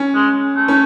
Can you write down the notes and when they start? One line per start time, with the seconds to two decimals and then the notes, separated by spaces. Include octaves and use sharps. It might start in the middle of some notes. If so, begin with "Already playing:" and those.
Already playing: C#4
0.15 G#3
0.56 A3
0.68 C#4